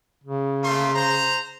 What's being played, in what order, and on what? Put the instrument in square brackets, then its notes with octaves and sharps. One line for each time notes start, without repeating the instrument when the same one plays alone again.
[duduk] C#3
[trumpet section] A3 A#3 C6
C5 A#5